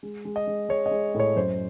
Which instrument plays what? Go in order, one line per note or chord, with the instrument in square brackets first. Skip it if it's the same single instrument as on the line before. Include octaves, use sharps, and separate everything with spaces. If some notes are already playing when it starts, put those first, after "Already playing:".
[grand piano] G#3
G#3
D#5
G#3
G#3 C#5
D#5
G#3
A2
C#5
F#2 C5